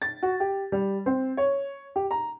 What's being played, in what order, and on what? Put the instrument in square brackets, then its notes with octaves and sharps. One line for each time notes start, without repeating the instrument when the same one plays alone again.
[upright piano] A6
F#4
G4
G3
C4
C#5
G4
A#5